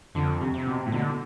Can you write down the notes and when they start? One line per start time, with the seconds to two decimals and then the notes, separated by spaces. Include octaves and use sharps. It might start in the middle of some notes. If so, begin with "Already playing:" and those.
0.15 F2 D3
0.41 C3
0.54 C3
0.67 B2
0.86 A2
0.92 B2 D3